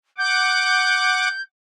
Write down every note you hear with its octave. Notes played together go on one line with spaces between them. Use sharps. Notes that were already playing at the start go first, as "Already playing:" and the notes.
F#5 D6 G6